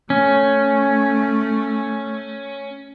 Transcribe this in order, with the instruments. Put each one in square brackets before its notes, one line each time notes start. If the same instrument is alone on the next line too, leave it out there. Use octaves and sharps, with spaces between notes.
[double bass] A3 [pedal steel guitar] C#4